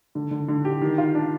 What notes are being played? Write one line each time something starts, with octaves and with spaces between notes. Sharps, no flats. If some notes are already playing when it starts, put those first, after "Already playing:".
D3
D3
D3
G4
D#3
F4
D4